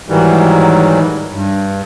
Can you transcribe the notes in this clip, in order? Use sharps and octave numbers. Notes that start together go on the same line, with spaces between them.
G#2 D#3 E3 F#3 G3
G2